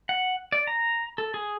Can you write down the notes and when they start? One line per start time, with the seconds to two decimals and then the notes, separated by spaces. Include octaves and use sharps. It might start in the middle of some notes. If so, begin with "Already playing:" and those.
0.09 F#5
0.52 D5
0.67 A#5
1.18 A4
1.34 G#4